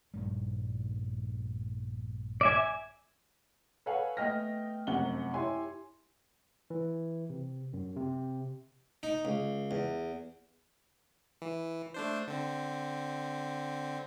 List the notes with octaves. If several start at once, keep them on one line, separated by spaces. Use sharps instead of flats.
A#1 G2 G3
D5 E5 G#5
A4 B4 C#5 F5 F#5 G#5
A3 B3 D#5 G5 F6 A#6
F1 F#2 C3 F#5 G7
E4 G4 C#5 G#5 C6
E3
C3
F#2
C3
D#4
C#2
E2
E3
A3 D4 C5
D3 C4